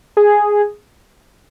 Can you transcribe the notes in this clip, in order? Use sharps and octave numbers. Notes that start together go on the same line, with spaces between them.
G#4